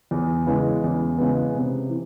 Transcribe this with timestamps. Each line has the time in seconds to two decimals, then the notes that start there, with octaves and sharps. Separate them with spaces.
0.11 E2
0.47 C#3 E3 G#3 B3
0.84 E2
1.18 C#3 E3 G#3 B3
1.55 C3
1.89 E3